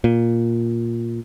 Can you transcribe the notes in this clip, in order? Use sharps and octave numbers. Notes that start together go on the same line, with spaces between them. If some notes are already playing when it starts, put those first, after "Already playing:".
A#2